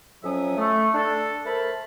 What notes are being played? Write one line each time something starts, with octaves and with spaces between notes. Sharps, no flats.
F2 F#3 C#4 E5 D#6
A3
D4 A4
A3 A#4 C5 A5 B5